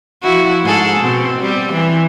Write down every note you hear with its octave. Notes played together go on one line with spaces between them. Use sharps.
F3 E4 F#4
G#2 G#4 A4
B2 C4
G3 C4
E3